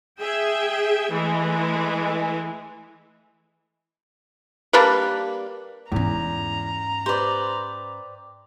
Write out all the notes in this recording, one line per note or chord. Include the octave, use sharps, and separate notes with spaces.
G#4 E5 G5
E3 G#3 A3
G3 A#3 D4 B4
E2 G#2 C#4 A#5
G4 B4 C5 D5